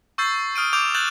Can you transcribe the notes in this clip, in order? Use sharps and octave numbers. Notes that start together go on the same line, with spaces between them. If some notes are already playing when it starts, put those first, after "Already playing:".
C#6 E6 G6 A6 C7
D#6 F6 D7 D#7
D6 G6 D7 F7
F#6 G6 A6 E7 F#7